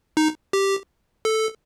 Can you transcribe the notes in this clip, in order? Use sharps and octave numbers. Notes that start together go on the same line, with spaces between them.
D#4
G4
A4